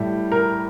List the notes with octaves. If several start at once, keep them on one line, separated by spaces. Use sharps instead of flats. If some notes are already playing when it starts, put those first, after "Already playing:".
Already playing: A2 G3
A#4